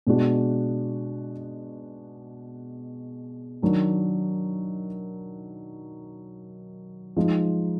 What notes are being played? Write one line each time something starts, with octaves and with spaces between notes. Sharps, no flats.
B2 G#3 D4 F#4
D#3 F#3 D4
F3 G#3 D#4